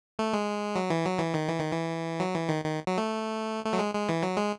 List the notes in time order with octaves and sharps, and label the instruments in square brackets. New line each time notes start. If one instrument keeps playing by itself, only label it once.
[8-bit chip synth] A3
G#3
F#3
E3
F#3
E3
D#3
E3
D#3
E3
F#3
E3
D#3
D#3
F#3
A3
A3
F#3
G#3
G#3
E3
F#3
G#3